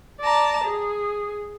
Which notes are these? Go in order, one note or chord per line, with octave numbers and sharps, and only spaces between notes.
D5 A5 A#5
G#4